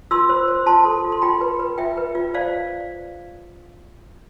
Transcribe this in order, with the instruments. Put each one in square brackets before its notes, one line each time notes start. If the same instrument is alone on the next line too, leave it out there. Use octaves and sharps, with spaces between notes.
[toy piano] F4 C6 E6
C5
C5
F4 A5 C6
A4
F4
C6
F4 G5 B5
B4
B4
F4 E5 G5
B4
F4
C5 D5 F5